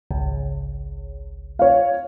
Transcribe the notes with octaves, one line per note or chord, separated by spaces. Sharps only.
G#1 C#2
C#5 F5